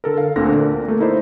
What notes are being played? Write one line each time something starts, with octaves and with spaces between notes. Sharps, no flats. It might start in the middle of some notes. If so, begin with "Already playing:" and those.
D3 A4 A#4
F5
D2 A#2 D3 C4 A#6
D4 A#4
A3 A#3
D#4 E4 C5 D5